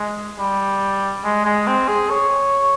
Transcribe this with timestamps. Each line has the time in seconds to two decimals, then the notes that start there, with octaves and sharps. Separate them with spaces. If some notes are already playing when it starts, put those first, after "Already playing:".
Already playing: G#3
0.39 G3
1.24 G#3
1.45 G#3
1.67 C4
1.88 G#4
2.10 C#5